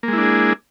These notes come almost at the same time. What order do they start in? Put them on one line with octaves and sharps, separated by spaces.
A#3 G#3 E4 D4 G#4